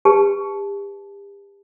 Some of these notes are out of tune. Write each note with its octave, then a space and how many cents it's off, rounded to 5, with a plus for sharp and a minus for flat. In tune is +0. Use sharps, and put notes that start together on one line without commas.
G4 +35 B4 +0 A5 -20